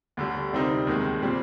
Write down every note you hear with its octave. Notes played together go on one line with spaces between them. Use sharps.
D2 D3 G3
C3 G3 C4 D#4 A#4
D#2 D#3 G#3
A#2 G3 C4